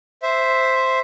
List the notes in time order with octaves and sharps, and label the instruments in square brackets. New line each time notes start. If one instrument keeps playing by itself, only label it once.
[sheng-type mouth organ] C5 E5